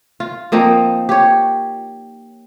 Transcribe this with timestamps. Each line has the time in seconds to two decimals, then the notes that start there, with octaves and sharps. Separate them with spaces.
0.20 F4
0.52 F3 A#3 C4 D#4
1.09 G4 C#5